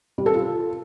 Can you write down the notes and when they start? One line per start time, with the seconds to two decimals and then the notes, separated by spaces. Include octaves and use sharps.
0.18 G3
0.26 A4
0.34 F4